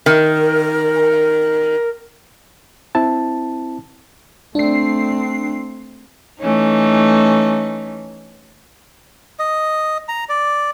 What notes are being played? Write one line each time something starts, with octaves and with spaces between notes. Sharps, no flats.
D#3 A#4
C4 E4 A5
A3 C4 D4 C7
E3 A3 C#4 D#4
D#5
A#5
D5